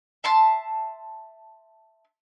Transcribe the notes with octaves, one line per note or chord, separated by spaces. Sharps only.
E5 A5 C6